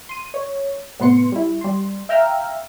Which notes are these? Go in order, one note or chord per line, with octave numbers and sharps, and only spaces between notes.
C6 D#7
C#5
A2 C3 B3 C6 C#7
G3 E4
G3 C6
E5 F5 G5 A#5 E6 F6